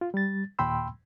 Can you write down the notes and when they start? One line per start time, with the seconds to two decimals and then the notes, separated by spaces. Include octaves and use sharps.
0.01 F4
0.14 G3 A6
0.59 D#2 A#2 G5 B5 C6 E6